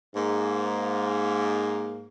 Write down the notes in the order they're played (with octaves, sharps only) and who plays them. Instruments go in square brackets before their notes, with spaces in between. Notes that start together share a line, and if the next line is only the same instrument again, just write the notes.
[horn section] G#2 A#3